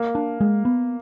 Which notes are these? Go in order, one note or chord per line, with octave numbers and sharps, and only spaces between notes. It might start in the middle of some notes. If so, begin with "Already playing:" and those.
Already playing: A#3
D4
G#3
B3